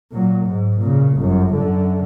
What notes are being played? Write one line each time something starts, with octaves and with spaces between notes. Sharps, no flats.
A#2 F#3
G#2
A#2 C#3
G1 F#2
F#2 D3